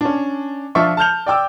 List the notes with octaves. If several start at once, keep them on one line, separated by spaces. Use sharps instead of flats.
C#4 D4
F3 D4 F4 E5 C#6
A5 F6 G6 F7
D5 G5 D6 E6